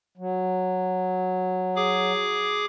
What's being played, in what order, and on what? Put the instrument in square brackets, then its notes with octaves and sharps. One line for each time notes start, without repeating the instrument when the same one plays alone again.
[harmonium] F#3
[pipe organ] G#4 D6